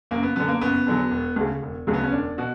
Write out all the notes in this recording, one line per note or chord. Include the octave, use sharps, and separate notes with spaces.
F#1 A#3
B3
F#2 D3 B3
A#3
F#1 B3
E2 D3 F#3
E1
D2 C#3
E1
D2 C#3 F#3
B3
C#4
E1 D4
B2 F#4